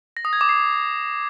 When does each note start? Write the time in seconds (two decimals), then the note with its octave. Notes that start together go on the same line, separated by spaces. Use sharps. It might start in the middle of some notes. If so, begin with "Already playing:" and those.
0.17 A#6
0.25 D#6
0.33 G#6
0.41 D6
0.49 C7